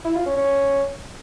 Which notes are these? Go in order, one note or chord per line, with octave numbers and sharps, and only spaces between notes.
E4
F4
C#4
C#4